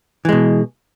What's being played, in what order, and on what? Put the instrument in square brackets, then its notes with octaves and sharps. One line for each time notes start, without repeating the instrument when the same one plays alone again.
[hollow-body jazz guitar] E3
G#3
B2